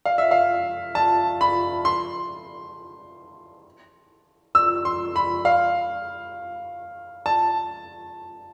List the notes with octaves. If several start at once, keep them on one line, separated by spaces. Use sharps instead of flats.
F5
E5
F5
A5
B5
C6
E6
C6
B5
F5
A5